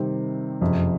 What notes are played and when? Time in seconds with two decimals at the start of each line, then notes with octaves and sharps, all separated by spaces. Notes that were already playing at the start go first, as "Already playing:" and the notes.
Already playing: C3 D#3 G3 C4
0.61 F#1 F2 C3